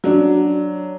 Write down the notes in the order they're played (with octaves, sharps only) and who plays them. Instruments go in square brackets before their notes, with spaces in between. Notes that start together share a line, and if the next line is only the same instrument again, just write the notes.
[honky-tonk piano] F#3 D4